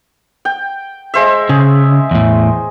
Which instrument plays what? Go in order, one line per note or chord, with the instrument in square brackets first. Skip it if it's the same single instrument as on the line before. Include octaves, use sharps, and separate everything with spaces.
[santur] G5
G#3 C5 E5
[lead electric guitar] C#3 [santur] G#4
[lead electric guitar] E2 A2